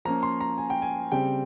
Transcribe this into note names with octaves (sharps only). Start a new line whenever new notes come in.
F3 A#3 C#4 A#5
C6
A#5
G#5
G5
G#5
C#3 G3 C4 G5